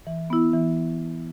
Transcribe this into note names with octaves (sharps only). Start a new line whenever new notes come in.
E3
B3 E4
E3